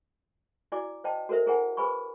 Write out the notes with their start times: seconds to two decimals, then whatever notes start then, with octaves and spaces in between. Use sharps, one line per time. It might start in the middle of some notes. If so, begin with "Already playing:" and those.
0.72 E4 F#4 D5 G#5 D6
1.04 C5 D#5 G5 A5
1.29 F#4 A4 A#4 C5 E5
1.46 E4 G#4 A#4 C5 F#5 G#5
1.77 G#4 B4 C5 G#5 B5 C#6